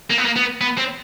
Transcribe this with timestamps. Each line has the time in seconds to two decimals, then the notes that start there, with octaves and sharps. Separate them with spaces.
0.10 A#3
0.18 B3
0.25 A#3
0.36 B3
0.61 B3
0.78 C4